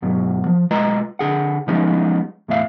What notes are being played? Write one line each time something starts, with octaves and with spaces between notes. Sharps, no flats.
G2 B2 F#3
F3
B1 G#3 F4 B4 D#5 A#5
D3 G#4 F#5
F3 G3 G#3 B3 C#4 D#4
E2 A2 E5 F5